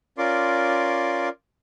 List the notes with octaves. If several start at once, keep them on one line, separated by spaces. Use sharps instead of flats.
C#4 F4 A#4 D5 C6 D6